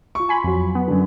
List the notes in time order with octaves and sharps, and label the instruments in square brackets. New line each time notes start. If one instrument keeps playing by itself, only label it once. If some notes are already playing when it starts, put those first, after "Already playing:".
[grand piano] F4 C#6
[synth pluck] G#5 B5 C6
F2 F#3
B3
[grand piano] F#2 D3